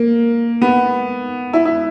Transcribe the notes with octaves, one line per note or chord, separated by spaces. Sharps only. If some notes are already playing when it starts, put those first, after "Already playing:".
Already playing: A#3
B3
E4
E4